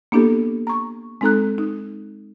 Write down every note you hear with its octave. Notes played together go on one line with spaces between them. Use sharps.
A#3 B3 D4 E4 G4 A4
A#5 C#6
G#3 C4 D#4 A4 A#5 F#6
D#4